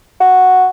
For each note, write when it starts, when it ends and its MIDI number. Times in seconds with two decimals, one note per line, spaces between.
0.20 0.67 66